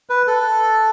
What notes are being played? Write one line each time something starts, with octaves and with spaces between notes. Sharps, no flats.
B4
A4